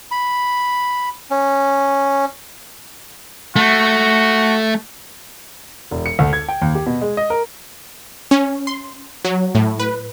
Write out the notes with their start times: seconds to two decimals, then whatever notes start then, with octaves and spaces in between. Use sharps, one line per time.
0.11 B5
1.31 C#4
3.56 A3 F#4
5.91 E1
6.06 C#7
6.19 D2
6.33 G#6
6.49 G5
6.62 D#2
6.75 G4
6.86 B2
7.01 G#3
7.17 D#5
7.30 A#4
8.31 C#4
8.67 C6
9.25 F#3
9.55 A2
9.80 B4